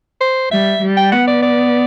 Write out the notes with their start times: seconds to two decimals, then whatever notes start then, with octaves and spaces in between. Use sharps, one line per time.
0.21 C5
0.51 G3 E5
0.82 G3
0.97 G5
1.12 B3 F#5
1.28 D5
1.43 D5